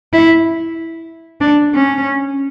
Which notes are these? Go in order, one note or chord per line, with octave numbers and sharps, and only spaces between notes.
E4
D4
C#4